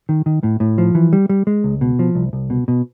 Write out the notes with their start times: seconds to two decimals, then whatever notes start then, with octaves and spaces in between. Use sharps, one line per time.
0.09 D#3
0.26 D#3
0.43 A2
0.60 A2
0.78 F3
0.95 E3
1.13 G3
1.29 G3
1.47 G#3
1.64 C#2
1.81 B2
1.99 F3
2.15 C2
2.33 C2
2.50 B2
2.68 B2